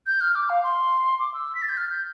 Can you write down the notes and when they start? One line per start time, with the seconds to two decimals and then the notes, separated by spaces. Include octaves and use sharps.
0.07 G6
0.21 F6
0.35 D6
0.50 F5
0.64 C6
1.19 D6
1.34 E6
1.55 B6
1.62 A6
1.69 G6
1.77 F6
1.90 G6